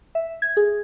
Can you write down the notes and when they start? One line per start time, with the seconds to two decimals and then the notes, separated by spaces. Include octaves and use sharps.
0.15 E5
0.42 G#6
0.57 G#4